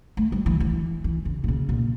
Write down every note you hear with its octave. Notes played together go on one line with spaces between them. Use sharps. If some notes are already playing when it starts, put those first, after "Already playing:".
A3
G3
E3
E3
E3
C#3
A#2
C#3
A#2